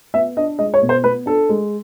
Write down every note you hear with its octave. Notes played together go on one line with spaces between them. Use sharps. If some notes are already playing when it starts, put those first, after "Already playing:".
B3 E5
D4 D#5
G#3 D#5
C#5
B2
C5
B3 B4
D4 A4
G#3